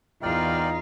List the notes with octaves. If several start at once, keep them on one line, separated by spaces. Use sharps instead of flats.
E2 D#4 F4 A#4 D5 F5 G5